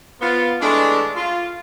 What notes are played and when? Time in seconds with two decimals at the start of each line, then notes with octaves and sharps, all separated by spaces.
0.21 B3 F4
0.62 E3 G#3 A3 D4
1.16 F4